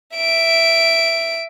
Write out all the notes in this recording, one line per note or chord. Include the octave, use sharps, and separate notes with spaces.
E5 D7